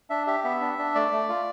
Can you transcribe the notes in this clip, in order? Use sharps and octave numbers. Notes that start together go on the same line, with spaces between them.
D4 E5
G4 E5
B3 E5
D4
D4
A3 D5
A3
F4